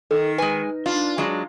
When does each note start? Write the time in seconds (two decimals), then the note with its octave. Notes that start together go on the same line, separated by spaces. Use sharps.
0.11 D#3 A4
0.38 G#3 B4 G#5
0.86 D4 F4
1.18 F#3 G#3 D4